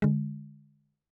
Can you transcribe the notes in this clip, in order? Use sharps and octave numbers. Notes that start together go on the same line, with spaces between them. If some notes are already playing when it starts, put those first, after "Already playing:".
D3 G#3